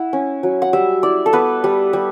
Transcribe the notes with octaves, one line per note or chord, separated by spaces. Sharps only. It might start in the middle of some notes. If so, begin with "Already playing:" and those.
Already playing: E4 F#5
C#4
F#3
F#5
G3 E5
E4 D5
A4
B3 B4
G3
G3